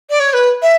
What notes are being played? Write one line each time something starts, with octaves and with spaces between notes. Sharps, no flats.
D5
C#5
B4
E5